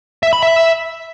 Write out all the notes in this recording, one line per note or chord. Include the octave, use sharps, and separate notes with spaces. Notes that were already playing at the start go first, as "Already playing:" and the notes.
E5
B5
E5